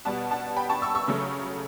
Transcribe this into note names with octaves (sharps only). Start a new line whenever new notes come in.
B2 G3 B3 F#5 A5
F#5 A5
G5 B5
A5 C#6
C#6 E6
C#6 E6
C#3 F#3 A3